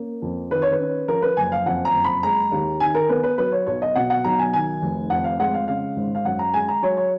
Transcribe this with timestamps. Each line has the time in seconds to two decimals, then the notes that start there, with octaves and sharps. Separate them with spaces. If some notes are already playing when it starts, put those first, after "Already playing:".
Already playing: A#3 C#4
0.22 F2
0.50 D#3 B4
0.62 C#5
0.72 B4
0.80 C#4
1.08 F3 A#4
1.22 B4
1.37 F#1 G#5
1.52 F5
1.66 F2 F#5
1.85 A#5
1.94 F#1
2.04 B5
2.23 G#3 A#5
2.52 D#2
2.80 D#3 G#5
2.94 A#4
3.09 B3 B4
3.23 B4
3.38 F#3 B4
3.52 C#5
3.66 B1 C#5
3.82 D#5
3.95 B2 F#5
4.10 F#5
4.24 B1 A#5
4.39 G#5
4.54 D#3 G#5
4.82 F1
5.10 F2 F#5
5.24 F5
5.39 G#3 F#5
5.54 F5
5.68 C#3 F5
5.97 G#1
6.15 F5
6.25 F#2 F#5
6.39 A#5
6.54 G#3 G#5
6.68 A#5
6.83 F#3 C#5
6.97 C#5